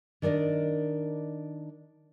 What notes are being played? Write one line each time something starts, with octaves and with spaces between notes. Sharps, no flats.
D#3 D4 A#4 D5 D#5